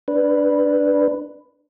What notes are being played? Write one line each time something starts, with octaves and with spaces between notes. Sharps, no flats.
D4 B4